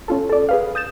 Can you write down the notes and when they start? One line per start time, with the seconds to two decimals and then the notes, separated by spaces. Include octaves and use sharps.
0.08 C#4 F4 A4
0.29 A4 D5
0.49 G#4 B4 F5
0.75 D#6 G6 A6 E7